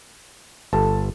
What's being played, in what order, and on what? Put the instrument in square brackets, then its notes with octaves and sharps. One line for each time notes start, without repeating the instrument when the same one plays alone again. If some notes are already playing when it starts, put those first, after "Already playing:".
[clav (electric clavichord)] G1 [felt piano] A4 A5